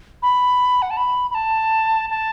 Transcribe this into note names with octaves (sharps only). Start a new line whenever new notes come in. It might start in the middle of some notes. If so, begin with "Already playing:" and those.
B5
F#5
A5
B5
B5
A5
A5